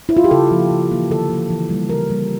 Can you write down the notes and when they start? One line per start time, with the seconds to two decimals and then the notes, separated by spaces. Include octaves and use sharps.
0.09 E4
0.17 F4
0.24 G4
0.31 C#3 A4
0.51 F3 A#3
0.71 C#3
0.91 E3 A#3
1.10 D3 A4
1.30 F3 A#3
1.50 E3
1.70 G3 A#3
1.89 C#3 A#4
2.10 G3 A#3